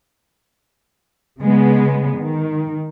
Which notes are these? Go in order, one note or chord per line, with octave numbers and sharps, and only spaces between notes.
C#3 G#3 B3
D#3